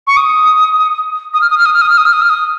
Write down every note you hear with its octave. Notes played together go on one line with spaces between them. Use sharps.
C#6
D#6
D#6
F6
D#6
F6
D#6
F6
D#6
F6
D#6
F6
D#6
F6
D#6